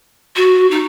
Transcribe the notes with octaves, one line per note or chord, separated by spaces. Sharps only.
F#4
D#4